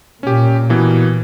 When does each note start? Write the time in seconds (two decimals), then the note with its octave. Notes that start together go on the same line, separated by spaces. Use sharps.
0.23 A#2 C#4 G4
0.69 B2 E3 A#3